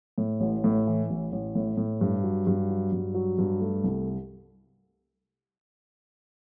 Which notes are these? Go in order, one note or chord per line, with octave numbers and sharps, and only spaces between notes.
A2
A1
A2
E3
A1
A1
A2
A2
G2
F#3
G2
F#3
G2
F#3
G2
A3
C2